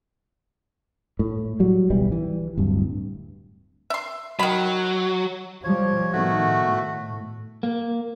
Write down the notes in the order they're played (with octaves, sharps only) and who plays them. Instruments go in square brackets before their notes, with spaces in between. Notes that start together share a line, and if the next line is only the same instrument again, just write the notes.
[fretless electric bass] A2
F#3 G3
D1 B1 E3 G3
E3
D1 G2
[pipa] E5 C6
[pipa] D#3 B5 [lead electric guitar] F#3
[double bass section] F3 G3 [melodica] C#5
[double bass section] A2 D#3 B3 [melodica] A3 F#4
[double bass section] A2
[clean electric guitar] A#3